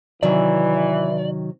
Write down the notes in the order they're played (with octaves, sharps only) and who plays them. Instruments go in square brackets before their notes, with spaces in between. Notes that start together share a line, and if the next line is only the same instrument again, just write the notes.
[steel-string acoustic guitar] C3 D#3 F#3 [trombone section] E3 [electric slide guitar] D5